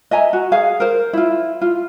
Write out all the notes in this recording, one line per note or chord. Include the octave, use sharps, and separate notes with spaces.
D#5 E5 G#5 A#5
F#4
G#4 F5
A#4 C5
E4 F4
F4